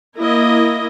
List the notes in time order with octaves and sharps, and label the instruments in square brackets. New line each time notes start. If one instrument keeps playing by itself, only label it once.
[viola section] A#3 E4 D#5